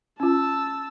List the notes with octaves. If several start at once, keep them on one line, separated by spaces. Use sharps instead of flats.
C#4 F4 A5 E6